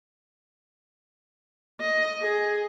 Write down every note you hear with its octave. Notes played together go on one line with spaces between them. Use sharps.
D#5
G#4